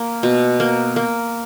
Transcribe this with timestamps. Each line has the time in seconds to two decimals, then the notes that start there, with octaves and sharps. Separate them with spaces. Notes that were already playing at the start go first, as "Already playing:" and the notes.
Already playing: A#3
0.23 B2
0.60 A#3
0.96 A#3